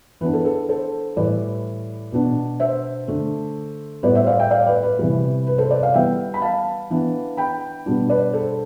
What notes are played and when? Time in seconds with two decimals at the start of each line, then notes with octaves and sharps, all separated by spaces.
0.21 E3 B3 D4 B4
0.33 A4
0.45 A4
0.69 A4 C5
1.16 A2 E3 G3 B4 D5
2.12 B2 B3 D4
2.60 C5 E5
3.08 D3 A3 D4
4.03 A2 G3 B3 B4 D5
4.15 C5 E5
4.27 D5 F5
4.39 E5 G5
4.51 D5 F5
4.67 B4 D5
4.83 B4
4.99 C3 E3 G3
5.47 B4
5.58 A4 C5
5.70 B4 D5
5.83 D5 F5
5.94 E3 G3 B3 E5 G5
6.34 B5
6.42 F5 A5
6.90 E3 B3 D4
7.37 G5 B5
7.86 B2 G3 B3 D4
8.10 B4 D5
8.33 A4 C5